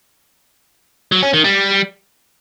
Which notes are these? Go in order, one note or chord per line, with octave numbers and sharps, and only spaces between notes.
F#3
C#4
D#3
G3